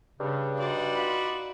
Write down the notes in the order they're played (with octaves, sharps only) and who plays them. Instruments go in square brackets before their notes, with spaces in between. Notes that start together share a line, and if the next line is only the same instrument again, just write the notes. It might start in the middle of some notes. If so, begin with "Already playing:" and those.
[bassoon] G2 [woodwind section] C#3
[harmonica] D#4 D5 C6 [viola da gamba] F#4
[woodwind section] F4 B5